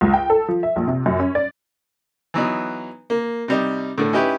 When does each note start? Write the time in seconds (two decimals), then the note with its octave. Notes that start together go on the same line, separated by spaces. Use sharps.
0.01 C#2
0.14 G5
0.30 A4
0.48 F3
0.63 E5
0.76 A#1
0.87 C3
1.06 F#2
1.20 C#4
1.35 D5
2.34 E3 F#3 B3 D#4
3.10 A#3
3.48 C3 G3 D#4
3.98 A2 D3
4.13 C#4 D#4 E4 G4 B4